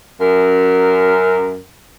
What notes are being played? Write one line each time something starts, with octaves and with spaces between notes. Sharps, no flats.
F#2 A#4